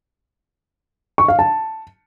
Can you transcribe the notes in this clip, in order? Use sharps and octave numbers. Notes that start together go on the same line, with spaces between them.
C#6
F5
A5